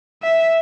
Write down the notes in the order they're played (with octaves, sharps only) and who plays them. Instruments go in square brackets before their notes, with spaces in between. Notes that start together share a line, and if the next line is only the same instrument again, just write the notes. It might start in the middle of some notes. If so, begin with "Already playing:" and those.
[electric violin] E5